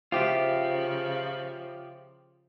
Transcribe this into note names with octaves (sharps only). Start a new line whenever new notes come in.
C#3 F3 F4 G4 C5 E5